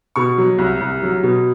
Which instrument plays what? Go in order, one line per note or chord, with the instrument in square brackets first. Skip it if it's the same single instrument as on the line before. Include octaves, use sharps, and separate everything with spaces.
[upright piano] B2 C#6
F#3
C2
C2
F#3
B2